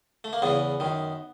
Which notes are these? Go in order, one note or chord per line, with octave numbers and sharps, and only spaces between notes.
A3
A#3
E2 C#3 E3 B3
F#2 D#3